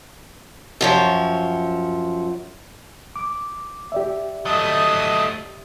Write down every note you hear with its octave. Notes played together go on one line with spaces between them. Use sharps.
F#2 F3 C#5
D6
G4 D5 E5
F#3 A3 D#5 A5 D#6